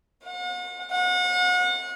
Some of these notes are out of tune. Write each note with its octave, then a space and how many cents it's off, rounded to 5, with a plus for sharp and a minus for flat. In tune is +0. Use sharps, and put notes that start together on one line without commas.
F#5 -45
F#5 -35